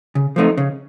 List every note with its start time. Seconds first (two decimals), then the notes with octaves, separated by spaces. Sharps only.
0.15 C#3
0.36 F3 A3 C4 D#4
0.57 C#3